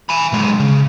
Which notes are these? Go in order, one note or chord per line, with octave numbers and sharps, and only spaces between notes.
G#5 B5
B1 G#3
C#3